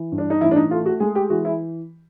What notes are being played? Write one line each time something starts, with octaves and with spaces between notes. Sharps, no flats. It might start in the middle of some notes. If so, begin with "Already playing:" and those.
Already playing: E3
G2
D4
D#4
A1 E4
D4
D#4
A3 F4
F#4
G#3 G#4
G4
E3 F#4
E4